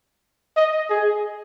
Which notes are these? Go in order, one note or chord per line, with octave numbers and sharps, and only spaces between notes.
D#5
G#4